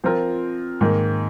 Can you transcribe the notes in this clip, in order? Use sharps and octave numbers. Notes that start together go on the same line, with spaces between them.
F3 C4 F4 A#4
G#2 D#3 A#3